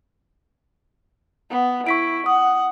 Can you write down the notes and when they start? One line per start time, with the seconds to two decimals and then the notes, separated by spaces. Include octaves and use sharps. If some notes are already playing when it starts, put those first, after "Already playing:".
1.50 B3
1.87 E4 C#6 B6 D7
2.26 F#5 D#6